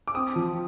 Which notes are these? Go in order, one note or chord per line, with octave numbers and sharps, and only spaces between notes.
D6
C4 D#6
F3